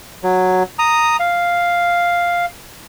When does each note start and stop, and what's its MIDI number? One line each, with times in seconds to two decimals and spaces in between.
0.23 0.63 54
0.79 1.17 82
0.79 1.17 87
1.20 2.46 77